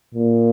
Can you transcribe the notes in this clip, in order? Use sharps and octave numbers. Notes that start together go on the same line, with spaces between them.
A#2